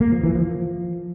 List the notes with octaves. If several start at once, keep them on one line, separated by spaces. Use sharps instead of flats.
A#3
F3
E3
F3